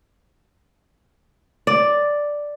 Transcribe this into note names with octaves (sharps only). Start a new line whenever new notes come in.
D5